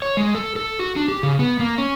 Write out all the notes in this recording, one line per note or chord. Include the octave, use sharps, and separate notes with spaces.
C#5
G#3
A4
A4
F#4
D4
G4
C#3
B3
A#3
C#4